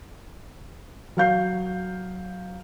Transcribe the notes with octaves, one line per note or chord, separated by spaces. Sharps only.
F#3 F5 G6 C7